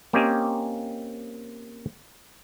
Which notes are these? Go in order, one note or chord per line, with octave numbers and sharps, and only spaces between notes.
A#3 C4 C#4 G4 D#5 G#5